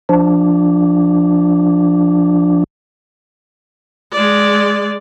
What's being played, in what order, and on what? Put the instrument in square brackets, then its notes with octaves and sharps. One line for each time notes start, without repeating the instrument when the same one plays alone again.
[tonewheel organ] F3 D4
[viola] G#3 D5